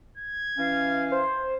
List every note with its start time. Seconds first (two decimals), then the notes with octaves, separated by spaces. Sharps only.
0.17 G#6
0.58 E3 C#4 F5
1.12 C5